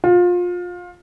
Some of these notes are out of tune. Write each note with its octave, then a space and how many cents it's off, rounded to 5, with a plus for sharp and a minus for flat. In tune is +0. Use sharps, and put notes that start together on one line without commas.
F4 +25